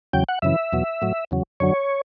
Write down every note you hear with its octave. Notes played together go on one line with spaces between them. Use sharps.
E2 C#3 F#3 G5
F#5
F#2 C#3 E3 E5
E2 B2 F#3
A2 F#3
E2 C#3 F#3
F#2 D3 F#3 C#5